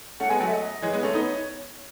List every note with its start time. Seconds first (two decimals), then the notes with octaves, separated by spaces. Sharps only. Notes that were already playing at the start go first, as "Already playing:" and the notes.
0.20 A3 C#4 F#5
0.29 G#3 B3 G#5
0.40 F#3 A3 F#5
0.46 E5
0.52 D#5
0.82 E3 G#3 C#5
0.93 G#3 B3
1.03 A3 C#4
1.14 B3 D#4